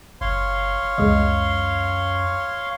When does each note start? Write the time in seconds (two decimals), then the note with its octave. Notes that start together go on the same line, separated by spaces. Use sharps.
0.21 F#1 C#5 F5 C6
0.98 C#2 F#2 G#3 D#5